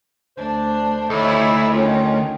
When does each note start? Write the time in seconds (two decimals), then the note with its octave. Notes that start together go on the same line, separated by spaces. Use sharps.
0.37 D2 D4 C5
1.10 D2 D#4 E4 A4 C#5
1.73 D#3 C#4 D#4 F4